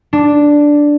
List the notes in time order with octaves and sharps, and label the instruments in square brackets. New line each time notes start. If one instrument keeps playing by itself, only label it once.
[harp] D4